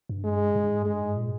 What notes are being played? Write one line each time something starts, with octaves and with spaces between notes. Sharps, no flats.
G2
G#3
G2
G#2
G2 G#3
G#2
A#2